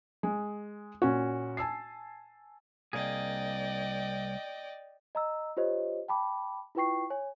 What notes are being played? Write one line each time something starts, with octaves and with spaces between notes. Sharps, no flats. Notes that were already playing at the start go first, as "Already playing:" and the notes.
G#3
A#2 C#4 F#4
G#5 A5 E6 C7
C2 A#3 G#4 D5 D#5 G5
D#5 A#5 E6
F4 G4 C5 C#5 D#5
G5 A5 B5 D6
E4 F4 B4 G5 C#6 C7
C#5 G#5